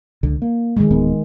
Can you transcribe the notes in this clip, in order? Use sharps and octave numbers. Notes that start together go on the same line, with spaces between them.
C#2 D3
A#3
D#3 G#3
D1 B3